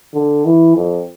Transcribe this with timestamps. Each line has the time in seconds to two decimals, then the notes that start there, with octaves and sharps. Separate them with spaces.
0.14 D3
0.45 E3
0.75 F2